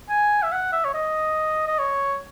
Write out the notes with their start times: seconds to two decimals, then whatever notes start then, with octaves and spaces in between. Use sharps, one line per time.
0.09 G#5
0.42 E5
0.52 F#5
0.72 E5
0.85 C#5
0.94 D#5
1.67 D#5
1.79 C#5